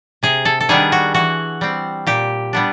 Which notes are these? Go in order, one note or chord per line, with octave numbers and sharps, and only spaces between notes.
C3 G#4
A4
A4
D#3 G3 B3 D4 G#4
F#4
E3 F#4
G3 C4
A#2 G4
G3 B3 D4